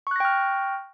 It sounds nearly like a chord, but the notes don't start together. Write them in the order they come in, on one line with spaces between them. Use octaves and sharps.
C#6 F#6 A#6 G5 F6